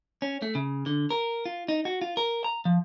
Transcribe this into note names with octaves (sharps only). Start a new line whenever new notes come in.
C#4
A3
C#3
D3
A#4
F4
D#4
F#4
F4
A#4
A#5
F3